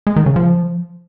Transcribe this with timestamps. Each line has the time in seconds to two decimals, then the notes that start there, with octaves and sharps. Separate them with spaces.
0.07 G#3
0.16 D#3
0.26 C#3
0.36 F3